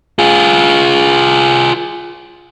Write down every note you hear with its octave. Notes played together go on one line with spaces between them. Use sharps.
F4 G#4